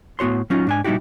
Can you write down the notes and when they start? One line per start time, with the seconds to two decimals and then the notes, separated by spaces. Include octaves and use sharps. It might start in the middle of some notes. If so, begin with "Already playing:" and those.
0.19 A2 B3 F#4 C#5 C6
0.50 F#3 C#4 D#4 F4
0.67 G#2 D4 G#5
0.84 A#2 G3 D#4 E4 F#4 G4